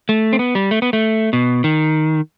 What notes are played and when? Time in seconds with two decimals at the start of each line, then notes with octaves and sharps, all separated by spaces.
0.09 A3
0.33 C4
0.39 B3
0.55 G3
0.71 A3
0.82 B3
0.93 A3
1.33 B2
1.64 D#3